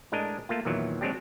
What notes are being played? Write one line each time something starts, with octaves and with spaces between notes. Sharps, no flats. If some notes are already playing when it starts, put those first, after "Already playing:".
A2 G#3 D4 A#4 D#5
A3 A#3 F4
E2 A#2 D#3 E3 F#3
F#3 G#3 C4 D4 G4